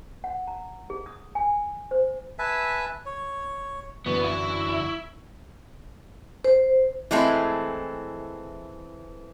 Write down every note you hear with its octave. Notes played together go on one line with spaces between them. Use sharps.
F#5
A#5
G#4
D#6
G#5
C5
B4 E5 G#5 A5
C#5
F#2 D3 E3 B3 C#6
E4
C5
E3 G#3 A3 C4 E4